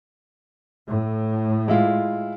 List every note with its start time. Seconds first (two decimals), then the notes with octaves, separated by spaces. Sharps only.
0.89 A2
1.68 G#3 E4 F4